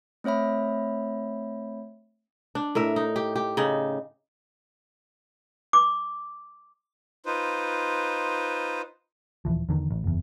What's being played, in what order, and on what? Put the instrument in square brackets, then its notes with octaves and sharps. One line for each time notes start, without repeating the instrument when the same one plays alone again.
[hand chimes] A3 C4 C#5 E5 B5
[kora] D4
A2 A#4 E5
D#4
G4
G4
C#3 D#4
[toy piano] D6
[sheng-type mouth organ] D#4 F4 B4 C5
[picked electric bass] D#1 D#2 E3 F3
E2 D3 D#3
A1
F#1 E2